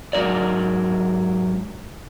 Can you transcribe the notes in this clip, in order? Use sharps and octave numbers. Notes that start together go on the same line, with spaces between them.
G#2 D#3 F#3 A#4 D5